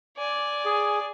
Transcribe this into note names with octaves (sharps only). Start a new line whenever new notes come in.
D5 G#5
G#4